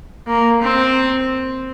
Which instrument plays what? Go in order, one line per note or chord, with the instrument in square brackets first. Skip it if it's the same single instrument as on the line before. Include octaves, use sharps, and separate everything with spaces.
[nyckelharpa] A#3
C4